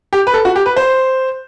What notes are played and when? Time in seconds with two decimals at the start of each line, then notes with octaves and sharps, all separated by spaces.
0.13 G4
0.27 B4
0.34 A4
0.45 F#4
0.56 G4
0.66 B4
0.76 C5